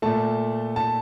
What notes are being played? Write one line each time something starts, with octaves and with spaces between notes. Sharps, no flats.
A#2 A3 A5
A5